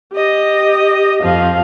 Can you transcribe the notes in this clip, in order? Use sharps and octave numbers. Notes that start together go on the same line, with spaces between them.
G4 D#5
F2 F3 F5